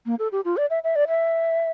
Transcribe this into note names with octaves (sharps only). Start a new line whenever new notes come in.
A#3
A4
G4
F4
D5
E5
E5
D5
E5